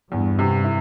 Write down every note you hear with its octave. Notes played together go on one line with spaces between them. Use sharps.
E2 G2
C3
E4